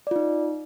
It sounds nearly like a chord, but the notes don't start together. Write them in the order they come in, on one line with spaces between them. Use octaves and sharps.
D5 F4 D#4